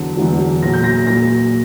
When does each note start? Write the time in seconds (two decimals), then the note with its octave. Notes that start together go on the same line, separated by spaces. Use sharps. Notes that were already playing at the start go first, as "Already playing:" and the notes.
Already playing: E2 D3 F#3
0.17 E2 D3 F#3
0.63 A#2 F#3 A#6
0.74 G6
0.84 A#6
1.07 A#2 F#3 A#6